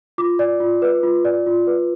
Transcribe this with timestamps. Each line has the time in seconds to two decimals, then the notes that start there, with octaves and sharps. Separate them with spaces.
0.18 F4 D6
0.39 D5
0.60 F4
0.82 B4
1.03 F4
1.25 D5
1.46 F4
1.67 B4